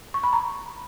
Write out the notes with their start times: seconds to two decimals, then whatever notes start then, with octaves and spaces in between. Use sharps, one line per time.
0.14 C#6
0.23 B5
0.33 A#5